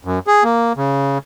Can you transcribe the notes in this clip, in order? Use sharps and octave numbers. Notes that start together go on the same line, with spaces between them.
F#2
G#4
A#3
C#3